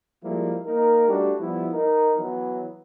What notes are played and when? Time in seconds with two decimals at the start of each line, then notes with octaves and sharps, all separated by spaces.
0.23 F3 G3 G#3 A#3 E4
0.67 A#3 D#4 A#4
1.07 G3 A3 D4 F#4 G4
1.39 F3 G3 B3 E4
1.73 D#4 A#4
2.17 E3 F#3 B3 E4